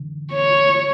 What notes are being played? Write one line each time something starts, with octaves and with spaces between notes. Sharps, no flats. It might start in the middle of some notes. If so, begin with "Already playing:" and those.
Already playing: D3
C#5